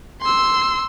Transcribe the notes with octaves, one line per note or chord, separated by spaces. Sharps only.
C6 E6